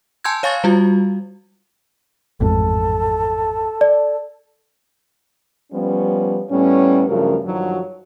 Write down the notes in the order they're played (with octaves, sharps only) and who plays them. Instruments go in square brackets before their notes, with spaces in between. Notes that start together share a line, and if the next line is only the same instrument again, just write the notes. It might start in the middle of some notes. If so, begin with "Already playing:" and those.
[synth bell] G#5 A5 C6 E6 G6 G#6
C#5 F5 G#5 C#6 A6
G3 F4 F#4
[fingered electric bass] A1 F2 G#2 [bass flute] A4
[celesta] D5
[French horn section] F3 G3 B3 C#4
A2 G3 B3 C#4
G2 C#3 F3 F#3 A3 A#4
G2 D#3 F3 F#3